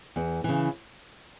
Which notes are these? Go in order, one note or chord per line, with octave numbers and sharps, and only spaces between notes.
E2
C#3 E3